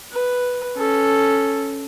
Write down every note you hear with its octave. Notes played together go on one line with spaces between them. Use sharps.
B4
C#4 A4